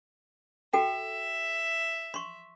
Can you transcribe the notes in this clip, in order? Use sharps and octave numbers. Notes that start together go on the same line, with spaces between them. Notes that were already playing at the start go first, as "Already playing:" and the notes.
F#4 A4 E5 G5
C6 C#6